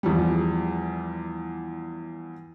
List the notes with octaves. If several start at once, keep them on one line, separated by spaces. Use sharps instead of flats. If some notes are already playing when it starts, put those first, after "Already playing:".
E2 F3 G3